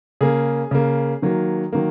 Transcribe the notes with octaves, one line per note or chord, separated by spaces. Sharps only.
C#3 A#3 G#4
C#3 A#3
D#3 F#3 A#3
D#3 F#3 A#3